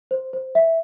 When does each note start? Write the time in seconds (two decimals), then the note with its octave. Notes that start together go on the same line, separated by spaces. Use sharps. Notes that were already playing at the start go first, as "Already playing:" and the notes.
0.11 C5
0.33 C5
0.55 E5